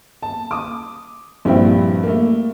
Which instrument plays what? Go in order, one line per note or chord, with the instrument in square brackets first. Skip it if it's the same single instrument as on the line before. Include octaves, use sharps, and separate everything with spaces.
[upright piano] A5
D6 D#6
A#1 G2 G3 C4 E4 G5
A3 A#3